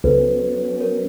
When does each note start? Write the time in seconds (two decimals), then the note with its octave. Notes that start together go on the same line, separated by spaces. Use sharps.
0.04 C#2 F#3 B3 C#4 A4 B4 C5
0.80 A#4 C#5